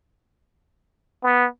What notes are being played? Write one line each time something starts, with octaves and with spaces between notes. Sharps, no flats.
B3